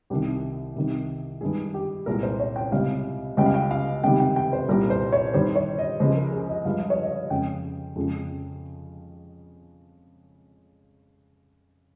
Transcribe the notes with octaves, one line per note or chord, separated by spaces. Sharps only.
C2 C3 D#3 G4
C2 C3 D#3
G2 D#3 G#3 G#4
G4
C2 A#2 G#3 A#4
C5
C#5
G5
C#2 C3 G3 F5
C#2 C#3 G3 G5
F5
G5
F5
C#2 C3 D#3 G3 G5
G5
G5
C5
C2 A#2 G3 A#4
C5
C#5
G2 D#3 G3 C5
C#5
D#5
C#2 C#3 F3 G#3 C5
A#4
G#4
D#5
G2 F3 G#3 F5
D#5
C#5
D#5
F2 C#3 G#3 G5
F2 C#3 F3 G#3